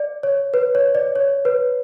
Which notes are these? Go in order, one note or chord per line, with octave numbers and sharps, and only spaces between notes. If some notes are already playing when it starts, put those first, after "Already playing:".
Already playing: D5
C#5
B4
C#5
D5
C#5
B4